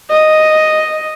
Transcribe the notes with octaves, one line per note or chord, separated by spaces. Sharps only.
D#5